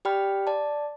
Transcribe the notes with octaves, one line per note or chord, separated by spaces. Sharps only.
G4 D5 G5 B5 F6
D5 A5